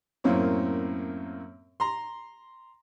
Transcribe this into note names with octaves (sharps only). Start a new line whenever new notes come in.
F#2 A2 A#3 C4 C#4
A#5 C6